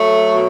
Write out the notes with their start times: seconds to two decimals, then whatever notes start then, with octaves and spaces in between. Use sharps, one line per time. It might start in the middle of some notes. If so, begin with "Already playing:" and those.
Already playing: F#3 A3
0.32 B2